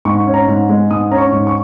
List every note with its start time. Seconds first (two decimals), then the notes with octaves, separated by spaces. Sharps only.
0.05 G#2 C#6
0.27 C#4
0.34 A#5
0.48 G#2
0.70 G#3
0.91 G#2 D#6
1.11 C#4 A#5
1.18 C#6
1.32 G#2
1.47 C#6